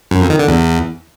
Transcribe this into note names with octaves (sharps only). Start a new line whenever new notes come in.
F#2
F2
D#3
D3
E2